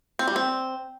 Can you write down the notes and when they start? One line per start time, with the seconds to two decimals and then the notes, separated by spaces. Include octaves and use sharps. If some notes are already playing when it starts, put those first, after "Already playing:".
0.19 C4
0.28 G3
0.36 C4